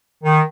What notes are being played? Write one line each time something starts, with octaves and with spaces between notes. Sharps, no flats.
D#3